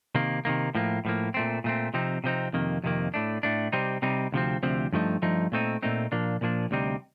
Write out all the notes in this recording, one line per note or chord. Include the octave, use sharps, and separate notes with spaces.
C3 D#3 A#3
C3 D#3 A#3
A2 F3 A#3
A2 F3 A#3
A#2 A3 C4
A#2 A3 C4
C3 F3 C4 D#4
C3 F3 C4 D#4
F2 C3 D#3 A#3
F2 C3 D#3 A#3
A2 A3 D4
A2 A3 D4
C3 G3 C4 D#4
C3 G3 C4 D#4
D2 C3 F3 C4
D2 C3 F3 C4
G2 F3 A3 D#4
G2 F3 A3 D#4
A#2 A3 C4 D#4
A#2 A3 C4 D#4
A#2 F3 A#3 D4
A#2 F3 A#3 D4
D2 C3 G3 C4 D#4